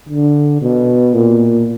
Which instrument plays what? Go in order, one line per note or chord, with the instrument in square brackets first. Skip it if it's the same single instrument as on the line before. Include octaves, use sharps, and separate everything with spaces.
[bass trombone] D3
B2
A#2